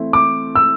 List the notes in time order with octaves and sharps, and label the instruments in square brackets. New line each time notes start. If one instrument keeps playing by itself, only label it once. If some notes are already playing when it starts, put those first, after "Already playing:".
Already playing: [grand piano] E3 A3 C4 E4
[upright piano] D6
E6